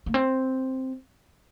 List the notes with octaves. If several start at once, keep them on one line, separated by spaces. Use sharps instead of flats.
A#3
C4